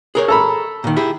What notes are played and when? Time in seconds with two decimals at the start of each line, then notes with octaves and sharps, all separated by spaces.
0.15 G#4 A#4 C#5
0.28 A4 A#5 B5
0.84 A#2 D#3
0.96 E4 G4 G#4